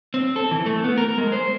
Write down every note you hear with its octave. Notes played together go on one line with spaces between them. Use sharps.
C4
A4
E3
A3
B3
A#4
G#3
C5